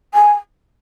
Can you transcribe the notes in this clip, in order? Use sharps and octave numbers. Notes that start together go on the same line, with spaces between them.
G#5